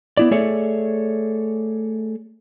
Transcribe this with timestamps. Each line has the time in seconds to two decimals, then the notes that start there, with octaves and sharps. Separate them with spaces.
0.17 B3 E4 D5
0.31 A3 G#4 A4 C#5 D5 E5